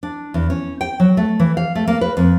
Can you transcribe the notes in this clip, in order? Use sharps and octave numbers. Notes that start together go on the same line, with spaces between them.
D4
E2
C#4
G5
F#3
A3
E3
F5
A3
A#3
B4
F2